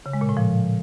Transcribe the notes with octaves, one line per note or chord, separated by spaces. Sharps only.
C#3
G#3
A#2
A2
F3